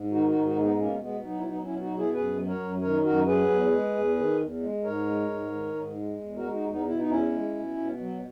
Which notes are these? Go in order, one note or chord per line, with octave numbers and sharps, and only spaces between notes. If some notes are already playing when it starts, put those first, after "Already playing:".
Already playing: G#2
D#3 D#4 F#4
D#4 F#4
G#2
D#4 F#4
G#3
B3 D#4
B2 A#3 C#4
B2 G#3 B3
F#3 B3 D#4
E4
F#3 B3 D#4
C#4 E4
B2
D#4 F#4
B2
E4 G#4
F#2 G#4 B4
F#3
A#4 C#5
F#2
D#3 A#4 C#5
F#2 F#4 A#4
F#3 G#4 B4
E2
G#3
E2
D#3
E2
G#3
G#2 A#4 C#5
G#3
G#2
D#3
G#2
G#3
E2
F#4 A#4
G#3
D#4 F#4
E2
B3 D#4
B2 E4
D#4
E2 C#4 E4
G#3
B2
B2
F#3